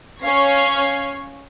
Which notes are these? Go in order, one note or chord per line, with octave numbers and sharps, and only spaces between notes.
C#4 C#5 F5 C#6 G#6 C7